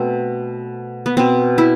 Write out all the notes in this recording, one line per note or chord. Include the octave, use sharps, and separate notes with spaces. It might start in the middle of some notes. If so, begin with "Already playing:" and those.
Already playing: B2 A3 C4
B3
B2 B3 C4
E4